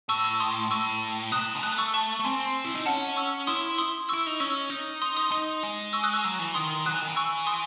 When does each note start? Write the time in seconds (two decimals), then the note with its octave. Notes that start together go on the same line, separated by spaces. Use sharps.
0.09 A2 C#6 E6
0.24 C#6 E6
0.40 C6 D#6
0.71 A2 C#6 E6
1.32 C3 D#6 F#6
1.63 A3 D#6 F#6
1.78 C#6 E6
1.94 A5 C#6
2.20 A3
2.24 C4 G#5 C6
2.65 E4
2.75 D#4
2.86 C#4 F#5 A5
3.16 C#6 E6
3.47 E4 C6 D#6
3.78 C6 D#6
4.09 E4 C#6 E6
4.26 D#4
4.40 C#4 C#6 E6
4.70 D#4
5.02 C6 D#6
5.17 C6 D#6
5.32 D#4 C6 D#6
5.63 G#3
5.93 C#6 E6
6.03 D#6 F#6
6.13 C#6 E6
6.25 F#3
6.39 E3
6.54 D#3 C6 D#6
6.86 F#3 D#6 F#6
6.93 E3
7.01 D#3
7.09 E3
7.16 C#6 E6
7.47 C6 D#6